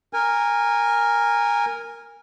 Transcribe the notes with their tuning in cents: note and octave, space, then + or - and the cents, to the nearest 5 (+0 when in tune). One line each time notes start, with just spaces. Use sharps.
A#4 +0 G#5 -20